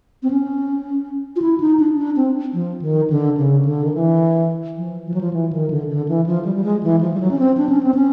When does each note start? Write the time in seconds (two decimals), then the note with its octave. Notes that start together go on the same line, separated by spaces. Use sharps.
0.23 C4
0.30 C#4
1.36 F4
1.42 E4
1.60 D#4
1.80 D4
1.97 D4
2.16 C4
2.53 F3
2.82 D#3
3.10 D3
3.37 C#3
3.65 D3
3.84 D#3
3.94 E3
4.77 F3
5.06 F3
5.14 F#3
5.21 F3
5.33 E3
5.53 D#3
5.70 D3
5.89 D3
6.08 E3
6.26 F3
6.45 G3
6.55 G3
6.64 G#3
6.83 E3
7.01 F3
7.14 G3
7.20 F#3
7.31 C#4
7.39 C4
7.57 D4
7.69 C#4
7.83 C4
7.94 C#4